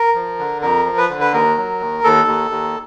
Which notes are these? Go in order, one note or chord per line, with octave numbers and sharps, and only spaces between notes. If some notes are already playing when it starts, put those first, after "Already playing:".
Already playing: A#4
F3
D3
F2 A#4
F3
B4
D3
B4
D#2 A#4
F#3
D#2
D#2 A4
D#2
D#2